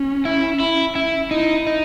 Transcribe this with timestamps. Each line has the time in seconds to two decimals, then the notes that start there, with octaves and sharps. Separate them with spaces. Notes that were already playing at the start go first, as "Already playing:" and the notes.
Already playing: C#4
0.25 E4
0.60 E4
0.95 E4
1.31 D#4 E4
1.67 D#4